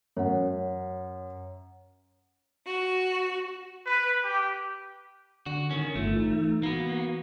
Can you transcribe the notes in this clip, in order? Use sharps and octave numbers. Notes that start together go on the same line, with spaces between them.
F#2 C#5 F#5
F#4
B4
G4
D3 F#4
D#3 C#4 A#4
G1 A3 F4
E3 D#4
A#3 B3 F#4